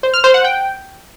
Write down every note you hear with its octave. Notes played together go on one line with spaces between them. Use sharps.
C5
F6
C5
F#5
G5